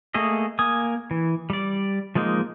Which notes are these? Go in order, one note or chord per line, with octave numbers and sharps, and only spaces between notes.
A3 A#3 G#4 D#5
A#3 G#5 D#6
E3
G3 D5
F3 G#3 A#3 D#4